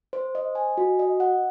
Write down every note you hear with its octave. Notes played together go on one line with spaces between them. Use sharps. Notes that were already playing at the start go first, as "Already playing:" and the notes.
C5
D#5
G#5
F#4
D#5
F#5